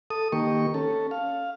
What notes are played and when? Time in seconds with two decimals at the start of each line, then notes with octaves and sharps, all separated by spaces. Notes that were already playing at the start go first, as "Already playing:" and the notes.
0.10 A4 D#6
0.32 D#3 A#3 G4 C#6
0.74 C#4 A4
1.11 F5